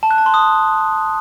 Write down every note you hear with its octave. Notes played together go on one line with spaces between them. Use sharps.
A5
F#6
A5
C6
D#6